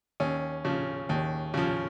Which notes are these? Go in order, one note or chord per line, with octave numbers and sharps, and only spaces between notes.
D#2 C#4
C#3 F3
D#2
C#3 F3